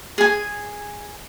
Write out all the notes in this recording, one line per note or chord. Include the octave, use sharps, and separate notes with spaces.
G#4 G#5